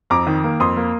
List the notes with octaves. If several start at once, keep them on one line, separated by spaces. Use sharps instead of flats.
F2 A#5 D6
D#3
A#3
F2 C6 D#6
A#3